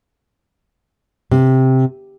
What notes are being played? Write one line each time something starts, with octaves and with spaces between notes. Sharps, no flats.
C3